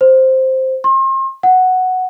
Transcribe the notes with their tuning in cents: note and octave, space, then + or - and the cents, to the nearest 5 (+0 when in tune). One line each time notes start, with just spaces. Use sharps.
C5 +5
C6 +40
F#5 +0